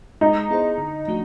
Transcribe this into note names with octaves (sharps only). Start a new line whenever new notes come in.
G#3 D#4
B3 E4 G#4 C5
D3
F3 A3 D4 F#4